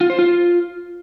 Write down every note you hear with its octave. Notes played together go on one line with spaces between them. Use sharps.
F4
C5
F4